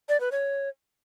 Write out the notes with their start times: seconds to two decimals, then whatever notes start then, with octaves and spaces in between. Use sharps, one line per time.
0.09 D5
0.20 B4
0.32 C#5